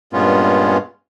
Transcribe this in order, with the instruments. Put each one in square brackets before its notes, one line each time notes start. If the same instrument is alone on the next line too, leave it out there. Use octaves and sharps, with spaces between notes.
[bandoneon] G2 A#2 G#3 B3 C#4 F4